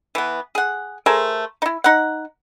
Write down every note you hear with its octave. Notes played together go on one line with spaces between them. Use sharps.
E3 B3
G#4 F#5
A3 G#4 A#4 C5
D#4 E4
D#4 F#5